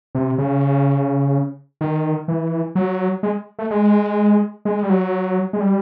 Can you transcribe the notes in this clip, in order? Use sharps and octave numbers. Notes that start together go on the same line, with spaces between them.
C3
C#3
D#3
E3
F#3
G#3
A3
G#3
G#3
G3
F#3
G#3
G3